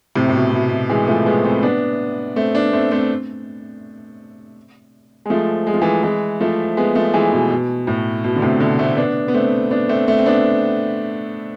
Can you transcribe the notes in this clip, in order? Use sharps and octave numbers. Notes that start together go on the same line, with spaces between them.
A2 C3
A2
B2
B2
B2
E3 G#3
F3 A3
G#3 B3
A3 C4
B3 D4
A3 C4
B3 D4
A3 C4
A3 C4
G#3
F3 A3
G#3
F3
E3 G#3
E3 G#3
F3 A3
G#3 B3
F3 A3
E3 G#3
B2
B2
A2
B2
D3
A2 C3
B2 D3
A3 C4
B3 D4
B3
A3 C4
B3 D4
A3 C4
A3 C4
C4
B3 D4